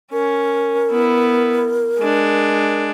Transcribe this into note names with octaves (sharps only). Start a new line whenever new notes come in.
C#4 A#4
B3 E4
G#3 D4